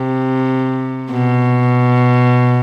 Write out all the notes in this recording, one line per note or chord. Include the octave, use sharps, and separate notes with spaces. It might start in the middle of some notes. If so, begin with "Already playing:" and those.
Already playing: C3
B2